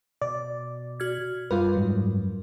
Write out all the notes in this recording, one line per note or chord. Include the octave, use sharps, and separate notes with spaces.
B2 D5
F#4 F6 G#6
F#2 G3 F4 A#4 B4
G#2 F#3